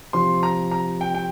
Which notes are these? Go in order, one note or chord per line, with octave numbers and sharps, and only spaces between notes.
C3 F3 C4 C6
A#5
A#5
G5
G5